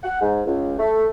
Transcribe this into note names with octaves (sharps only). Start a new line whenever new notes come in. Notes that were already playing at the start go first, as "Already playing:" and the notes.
F#5
G#2
C#2
A3